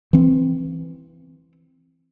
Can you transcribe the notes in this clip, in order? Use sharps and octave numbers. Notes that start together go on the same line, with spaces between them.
E3 C4